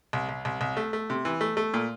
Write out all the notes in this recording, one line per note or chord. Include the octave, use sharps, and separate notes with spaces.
C2
C2
C2
C2
A3
A3
C3
E3
A3
A3
A#2